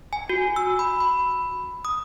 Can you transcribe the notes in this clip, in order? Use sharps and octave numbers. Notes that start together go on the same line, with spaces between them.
G#5
F#4
E6
B5
B5
D#6